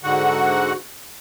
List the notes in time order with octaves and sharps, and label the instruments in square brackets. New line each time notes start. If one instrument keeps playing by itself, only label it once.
[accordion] G#2 D3 F#4 F#5